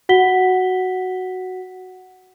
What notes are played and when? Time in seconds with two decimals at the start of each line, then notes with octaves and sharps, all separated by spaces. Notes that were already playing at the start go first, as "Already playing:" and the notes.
0.09 F#4 F#5 B6 G7